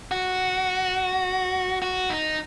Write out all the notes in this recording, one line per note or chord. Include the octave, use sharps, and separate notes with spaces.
F#4
F#4
D#4